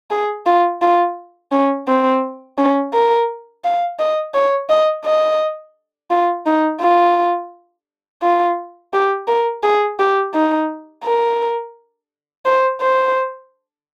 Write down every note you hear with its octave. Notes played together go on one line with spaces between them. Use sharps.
G#4
F4
F4
C#4
C4
C#4
A#4
F5
D#5
C#5
D#5
D#5
F4
D#4
F4
F4
G4
A#4
G#4
G4
D#4
A#4
C5
C5